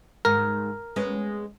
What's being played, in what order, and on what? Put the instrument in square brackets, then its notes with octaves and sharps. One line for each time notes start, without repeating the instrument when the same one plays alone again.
[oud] G#2 D#3 [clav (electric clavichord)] A#4
[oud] G#3 B3 C#4